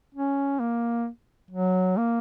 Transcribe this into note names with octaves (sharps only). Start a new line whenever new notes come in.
C#4
A#3
F#3
A#3